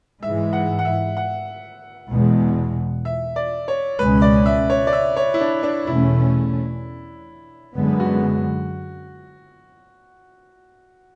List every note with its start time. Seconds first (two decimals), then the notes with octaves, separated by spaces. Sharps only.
0.22 G#2 E3 G#3 E5
0.53 F#5
0.79 F#5
0.85 E5
1.17 F#5
2.10 E2 B2 G#3
3.05 E5
3.36 D5
3.68 C#5
3.99 C#2 B2 G#3 C#4 B4
4.22 D5
4.46 E5
4.70 C#5
4.87 D5
4.93 E5
5.17 C#5
5.34 E4
5.41 D4
5.63 D4
5.87 E2 B2 A3 C#4 E4
7.75 F#2 D3 G#3 B3
8.00 F#4